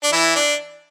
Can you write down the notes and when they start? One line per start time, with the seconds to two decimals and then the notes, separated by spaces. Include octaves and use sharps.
0.03 D4
0.12 E3 E4
0.36 D4